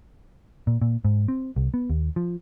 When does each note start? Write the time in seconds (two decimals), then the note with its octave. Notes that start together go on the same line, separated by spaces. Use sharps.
0.67 A#2
0.82 A#2
1.05 G#2
1.28 C4
1.56 C2
1.74 B3
1.90 D#2
2.16 F3